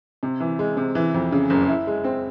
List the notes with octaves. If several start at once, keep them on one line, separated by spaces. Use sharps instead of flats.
C3
E3
G#3
C3
E3
F2
C#3
F#1
E4
G#3
C4